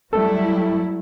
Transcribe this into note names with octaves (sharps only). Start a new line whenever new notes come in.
F#3 G3 A3 E4 A4